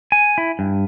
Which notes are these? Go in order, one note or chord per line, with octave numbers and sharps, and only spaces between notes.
G#5
E4
G2